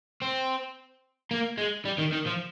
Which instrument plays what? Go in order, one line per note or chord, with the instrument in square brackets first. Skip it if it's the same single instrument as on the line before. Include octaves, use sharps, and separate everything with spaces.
[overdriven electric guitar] C4
A#3
G#3
G3
D#3
D#3
F3